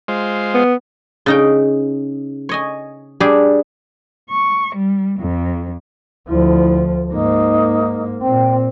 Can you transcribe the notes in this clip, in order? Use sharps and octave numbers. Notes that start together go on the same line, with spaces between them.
G#3 F4 C5
B3
C#3 D#4 G5
C#5 D#5 G#5
G3 D4 G4 G#4
C#6
G3
F2
D2 F3 E4
G#2 A#3 D#4
A#2 C4 G5